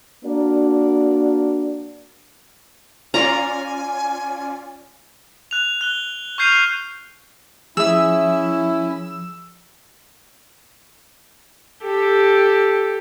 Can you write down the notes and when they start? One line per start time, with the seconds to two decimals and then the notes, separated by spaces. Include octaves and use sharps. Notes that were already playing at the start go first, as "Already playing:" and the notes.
0.25 A#3 D4 F#4 A#4 D5
3.14 C#4 F4 D5 G#5 A#5
5.51 F#6 F7
5.81 F#6 G7
6.38 C#6 F6 G6 C7 D#7 F7
7.77 F3 C#4 E4 G#4 E5 E6
11.83 G4 A4